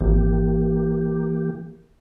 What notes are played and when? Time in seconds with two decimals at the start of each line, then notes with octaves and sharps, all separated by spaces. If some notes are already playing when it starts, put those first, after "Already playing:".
0.01 G#1 E3 A#3 G4